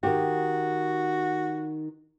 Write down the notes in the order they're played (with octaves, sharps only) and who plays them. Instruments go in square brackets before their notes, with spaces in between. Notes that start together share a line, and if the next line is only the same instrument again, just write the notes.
[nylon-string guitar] D#3 G4 [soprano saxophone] F#4